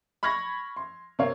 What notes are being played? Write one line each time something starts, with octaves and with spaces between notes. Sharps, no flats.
B5 C#6 F6 G#6 A#6
C6
C3 A#4 C#5 F5